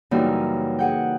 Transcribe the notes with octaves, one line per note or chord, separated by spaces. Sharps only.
F#2 C#3 E3 G3 A#3 D#4
G#4 F#5 G5